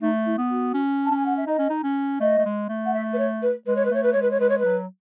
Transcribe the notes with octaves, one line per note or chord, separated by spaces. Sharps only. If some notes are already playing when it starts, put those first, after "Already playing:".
A3 D#4
E4
B3
F#4
C#4
A5
C#4 G#5
F#5
E5
D#4 D#5
C#4
D#4
C#4
A3 D#5
A3
G#3
A3
F#5
E5
B4
C#5
B4
G#3 B4
C#5
B4
A3 C#5
B4
G#3 C#5
B4
C#5
G#3 B4
C#5
B4
F#3